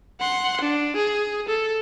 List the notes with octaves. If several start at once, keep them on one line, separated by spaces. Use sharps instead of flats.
F#5 C6
D4
G#4
A4